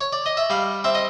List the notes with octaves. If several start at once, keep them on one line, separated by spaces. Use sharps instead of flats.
C#5
D5
D#5
E5
G3 F5
C4 E5
D#5